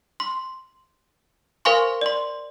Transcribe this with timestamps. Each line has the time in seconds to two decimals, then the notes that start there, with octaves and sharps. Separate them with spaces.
0.20 C6
1.65 A#4 C5 F5 G#5 C6 C#6
2.01 D5 C6